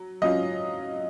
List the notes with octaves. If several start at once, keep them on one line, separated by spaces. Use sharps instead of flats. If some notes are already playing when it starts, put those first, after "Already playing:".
Already playing: F#3
F#3 C#4 F4 D#5